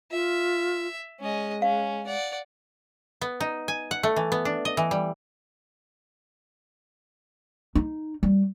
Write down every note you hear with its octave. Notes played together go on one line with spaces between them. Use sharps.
F4 E5
G#3 C#4 D#5
C#4 F5
D5 F#5
B3
D#4
G#5
F#5
A3
E3
B3
D4
D#5
E3
G3
D#4
G3